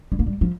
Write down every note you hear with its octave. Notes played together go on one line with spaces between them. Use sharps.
G3
A#3
G3
F3